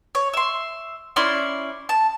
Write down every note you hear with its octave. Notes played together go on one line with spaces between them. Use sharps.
C#5
E5 C6
C#4 E4 D5 C6
A5